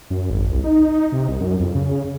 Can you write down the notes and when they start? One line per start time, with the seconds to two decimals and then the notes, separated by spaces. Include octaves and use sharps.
0.10 F#2
0.30 G#1
0.49 C2
0.64 D#4
1.12 C3
1.29 C2
1.41 F#2
1.59 F2
1.75 C#3